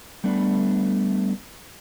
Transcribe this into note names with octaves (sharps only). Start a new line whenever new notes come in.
G3 A3 B3 D4 B4